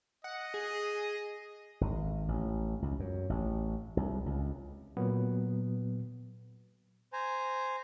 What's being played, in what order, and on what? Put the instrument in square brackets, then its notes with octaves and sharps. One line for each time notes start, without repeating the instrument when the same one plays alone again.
[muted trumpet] D#5 [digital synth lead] F#5
[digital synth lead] G#4
[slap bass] G#1
A1
C#2
F#2
A1
C2
C#2
[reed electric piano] A#2 F#3 B3
[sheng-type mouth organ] C5 G#5 A#5